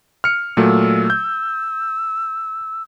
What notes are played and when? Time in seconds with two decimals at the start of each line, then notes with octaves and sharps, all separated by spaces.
0.24 F6 C#7
0.57 A#2 F#3 A3 E6
1.10 G6